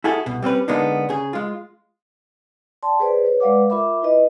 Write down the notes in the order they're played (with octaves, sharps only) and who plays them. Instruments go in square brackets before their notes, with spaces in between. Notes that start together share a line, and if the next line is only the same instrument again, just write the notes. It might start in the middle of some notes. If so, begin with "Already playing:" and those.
[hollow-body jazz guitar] E4 F#4 G#4 A4
C2 B2
G3 C4 C#4 B4
D3 G#3 A#3 B3 D4 D#4
C#3 G#4
G#3 F4
[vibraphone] D5 G5 A5 C6
G#4 B4 C5 D5
B4 C#5
G#3 B4 D5 F5 F#5 D6
F4 A#4 E5 B5 D6
E4 B4 D#5